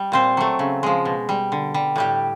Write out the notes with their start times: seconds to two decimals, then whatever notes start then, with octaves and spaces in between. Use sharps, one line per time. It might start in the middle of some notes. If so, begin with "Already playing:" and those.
Already playing: G3
0.12 A#2 C4 C5
0.37 F#3 A3
0.59 C#3
0.83 F3 G#3
1.05 B2
1.29 G3
1.52 D3
1.74 G3
1.96 A2 G3 G4